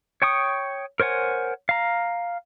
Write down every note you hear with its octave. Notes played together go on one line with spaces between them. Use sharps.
C#5 G5 C#6 D#6
A#4 C5 C#5 F#5 G#5
F5 A#5